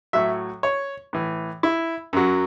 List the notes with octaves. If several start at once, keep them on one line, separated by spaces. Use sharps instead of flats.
A2 F#3 E5
C#5
A2 E3
E4
F#2 F#3